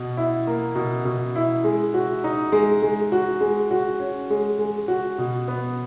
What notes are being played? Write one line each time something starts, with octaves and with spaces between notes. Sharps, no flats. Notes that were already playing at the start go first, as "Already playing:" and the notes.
Already playing: B2
E4
A#3
B2
B2
E4
G#3
F#4
D#4
G#3
G#3
F#4
G#3
F#4
C#4
G#3
G#3
F#4
B2
B3